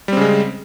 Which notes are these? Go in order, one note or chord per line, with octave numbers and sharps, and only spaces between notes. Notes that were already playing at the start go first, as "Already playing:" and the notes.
C#3 G3 G#3 C4